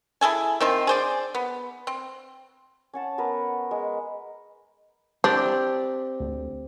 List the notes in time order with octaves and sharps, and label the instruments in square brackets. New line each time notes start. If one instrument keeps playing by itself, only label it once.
[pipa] E4 G#4 A4 G#5
D#3 C4 F4
G#4 C5 D5
B3
C4
[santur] C#4 F#5 A5
B3 A#4 B4
G#3
[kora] C4 G4 D5 [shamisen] D4
[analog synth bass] D2